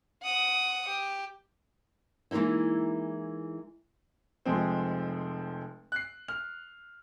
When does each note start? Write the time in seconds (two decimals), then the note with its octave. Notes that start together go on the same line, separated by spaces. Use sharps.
0.23 F#5 D#6
0.89 G4
2.31 E3 G#3 A#3 D#4 E4
4.45 F1 F3 G#3 C4
5.92 F#6 C7
6.28 F6